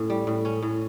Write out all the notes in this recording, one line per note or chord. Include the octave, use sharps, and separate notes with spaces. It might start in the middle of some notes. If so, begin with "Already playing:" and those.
Already playing: A2 C#4
G3
A2
C#4
A2